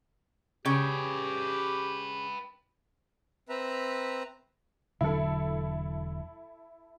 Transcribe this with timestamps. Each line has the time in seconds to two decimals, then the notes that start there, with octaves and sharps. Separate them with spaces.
0.66 C#3 G4 B4 G5
3.49 C4 B4 E5 A#5
5.01 E1 D3 F#3 E4 A4